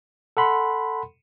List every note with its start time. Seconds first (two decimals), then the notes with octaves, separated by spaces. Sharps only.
0.37 A4 F#5 B5 C6